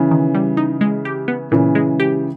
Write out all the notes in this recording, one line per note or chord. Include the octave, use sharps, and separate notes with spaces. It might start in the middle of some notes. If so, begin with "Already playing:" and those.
Already playing: C#3 E3 B3
D#3
G3
D#4
G#3
G4
B3
A#2 C#3 E3
G#3
G4